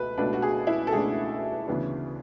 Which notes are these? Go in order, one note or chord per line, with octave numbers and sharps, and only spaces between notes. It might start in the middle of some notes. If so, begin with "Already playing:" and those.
Already playing: C#2 B2 A3 B4
C#2 B2 A3 D4 B4
F#4
G#4
E4
A4
C#2 B2 A3 D4 G#4
D2 C#3 E3 B3 D4